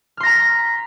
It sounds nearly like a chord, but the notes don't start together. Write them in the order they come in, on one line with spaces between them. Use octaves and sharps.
F6 C6 A#6 A#5 B6